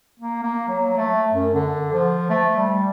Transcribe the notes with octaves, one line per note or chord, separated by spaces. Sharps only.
A#3
A#3
F#3
A3
F#2
D3
F3
A3
G3